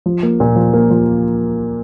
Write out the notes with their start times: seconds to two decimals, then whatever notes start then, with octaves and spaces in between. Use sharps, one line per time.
0.06 F3
0.23 A#3
0.40 A#2
0.56 F3
0.73 A#3
0.91 F3